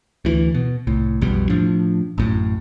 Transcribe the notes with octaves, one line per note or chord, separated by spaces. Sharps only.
D2 E3
B2
C2 A2
B1 F2 B2 G3
A2 F3 D4
A1 F#2 A2